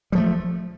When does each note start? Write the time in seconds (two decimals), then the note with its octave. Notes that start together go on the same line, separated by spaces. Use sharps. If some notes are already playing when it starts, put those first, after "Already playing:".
0.12 G3
0.15 F3
0.18 A3